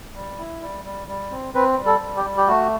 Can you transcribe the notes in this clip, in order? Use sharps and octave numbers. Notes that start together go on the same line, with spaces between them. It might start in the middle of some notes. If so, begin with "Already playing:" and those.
G3
E4
G3
G3
G3
C4
C4 B4
G3
A4
G3
G4
G3
G4
A3 F#4